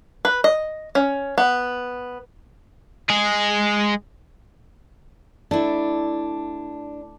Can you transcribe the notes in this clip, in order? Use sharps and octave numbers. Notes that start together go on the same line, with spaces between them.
B4
D#5
C#4
B3
G#3 G#4
A3 D4 E4